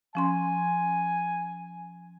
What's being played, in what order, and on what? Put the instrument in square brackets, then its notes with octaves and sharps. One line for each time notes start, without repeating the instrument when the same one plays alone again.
[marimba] F3 C#4 C6 [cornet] G#5